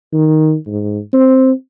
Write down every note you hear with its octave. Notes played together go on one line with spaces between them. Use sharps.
D#3
G#2
C4